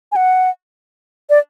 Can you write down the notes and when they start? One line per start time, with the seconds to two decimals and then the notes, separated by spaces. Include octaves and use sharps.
0.12 G#5
0.16 F#5
1.30 D5